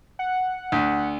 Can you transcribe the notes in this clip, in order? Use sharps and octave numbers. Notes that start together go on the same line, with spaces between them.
F#5
D2